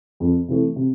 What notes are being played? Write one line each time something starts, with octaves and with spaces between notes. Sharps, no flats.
F2
C3 E3 A3
C3